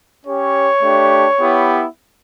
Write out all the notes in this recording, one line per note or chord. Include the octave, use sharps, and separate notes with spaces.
C#4 G4 C#5
A3 D4 G4
B3 E4 G4